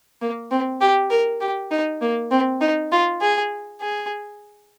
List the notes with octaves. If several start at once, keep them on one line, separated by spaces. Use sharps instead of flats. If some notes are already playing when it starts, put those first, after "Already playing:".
A#3
C4
G4
A#4
G4
D#4
A#3
C4
D#4
F4
G#4
G#4